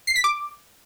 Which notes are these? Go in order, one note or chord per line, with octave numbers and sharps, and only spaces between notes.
C7
B6
D6